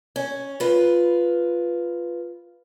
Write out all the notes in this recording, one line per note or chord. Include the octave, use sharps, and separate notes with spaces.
C#4
F4 B4